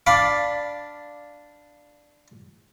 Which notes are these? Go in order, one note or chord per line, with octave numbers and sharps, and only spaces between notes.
D4 D5 F5 B5 D6